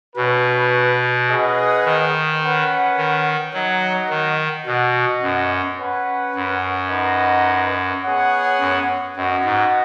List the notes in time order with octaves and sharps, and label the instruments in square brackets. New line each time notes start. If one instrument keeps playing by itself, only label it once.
[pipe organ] B2 [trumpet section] C#4 F#4 B4
[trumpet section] C#4 G#4 B4 D#5 F#5
[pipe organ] D#3
[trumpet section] C#4 B4 F#5
[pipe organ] D#3
[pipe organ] F#3 [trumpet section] D#4 F#4 D#5 F#5
[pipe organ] D#3
[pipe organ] B2 [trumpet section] B3 F#4 D#5 F#5
[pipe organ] F#2
[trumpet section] C#4 B4 F#5
[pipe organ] F#2
[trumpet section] D#4 B4 D#5 F#5
B3 G#4 C#5 F#5
[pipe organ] F#2
[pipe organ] F#2 [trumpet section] B3 F#4 D#5 F#5
[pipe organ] G#2